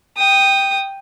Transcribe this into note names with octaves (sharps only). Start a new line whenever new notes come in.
G5 D#6